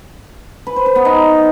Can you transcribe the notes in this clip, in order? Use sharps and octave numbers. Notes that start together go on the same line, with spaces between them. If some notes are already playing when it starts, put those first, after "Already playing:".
B4
C5
B4
B3
D#4